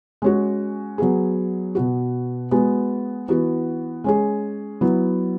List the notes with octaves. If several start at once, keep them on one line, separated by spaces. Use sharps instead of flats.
G#3 C#4 F#4
F#3 B3 G#4
B2 B3 F#4
G#3 B3 F#4
E3 B3 F#4
G#3 C#4 G#4
F#3 B3 E4